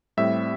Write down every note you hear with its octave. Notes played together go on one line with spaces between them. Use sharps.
A2 G3 C4 E5